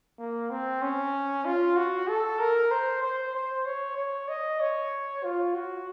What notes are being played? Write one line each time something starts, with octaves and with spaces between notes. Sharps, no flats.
A#3
C4
C#4
F4
F#4
A4
A#4
C5
C5
C5
C#5
C#5
D#5
C#5
F4
F#4